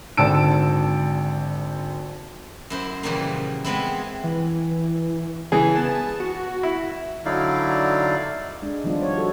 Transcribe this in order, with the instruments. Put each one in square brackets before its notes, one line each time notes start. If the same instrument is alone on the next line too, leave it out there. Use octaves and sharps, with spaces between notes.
[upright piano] G#1 D3 A5 E6 D7
[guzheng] F#2 E4 C5
A#2 C#3 E3 F3 G3 A#3
G#3 B3 C4 E4
[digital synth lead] E3
[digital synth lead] C#3 [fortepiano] E3 G#4
[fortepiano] B3 [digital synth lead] A5
[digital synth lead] F#4
[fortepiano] E4
[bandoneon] D3 F#3 D#4 E4 D5 F5
[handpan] G#3 D4
D#3 F3 G3 B3 D4 F4
C#5
F#4 A4